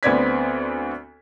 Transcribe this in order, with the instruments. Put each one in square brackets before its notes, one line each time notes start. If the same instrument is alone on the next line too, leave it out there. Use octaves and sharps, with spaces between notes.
[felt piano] D2 B3 C4 D5 G#6 B6